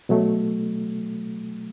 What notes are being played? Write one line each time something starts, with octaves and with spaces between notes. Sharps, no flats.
B2 F#3 A3